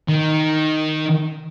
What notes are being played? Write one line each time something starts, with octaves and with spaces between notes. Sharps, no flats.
D#3